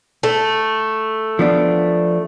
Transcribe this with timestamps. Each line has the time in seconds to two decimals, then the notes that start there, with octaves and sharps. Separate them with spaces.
0.23 A3
1.39 F3 B3 D4